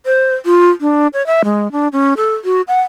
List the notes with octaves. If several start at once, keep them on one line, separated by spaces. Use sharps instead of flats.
C5
F4
D4
C#5
E5
G#3
D4
C#4
A4
F#4
F#5